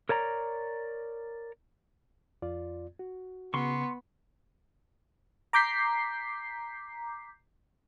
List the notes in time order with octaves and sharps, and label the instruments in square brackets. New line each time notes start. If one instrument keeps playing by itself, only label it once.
[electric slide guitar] A#4 C#5 D5 A#5
[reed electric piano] F2 F4 D5
F#4
[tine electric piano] C#3 [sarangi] B3 [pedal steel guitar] C6 C#6
[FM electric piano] A#5 D6 G6 B6 C7